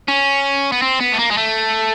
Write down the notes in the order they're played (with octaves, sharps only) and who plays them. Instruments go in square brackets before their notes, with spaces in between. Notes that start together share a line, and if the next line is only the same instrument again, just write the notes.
[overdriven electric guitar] C#4
B3
C4
B3
A3
A#3
G#3
A3